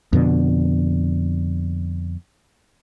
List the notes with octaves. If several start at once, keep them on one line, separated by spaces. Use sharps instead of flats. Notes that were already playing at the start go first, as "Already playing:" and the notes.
F2 B2 D3